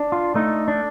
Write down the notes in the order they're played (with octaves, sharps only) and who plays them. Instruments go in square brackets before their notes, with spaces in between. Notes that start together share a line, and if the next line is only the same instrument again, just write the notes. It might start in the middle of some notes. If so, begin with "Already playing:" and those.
Already playing: [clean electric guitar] D4
F4
A3 D#4
D4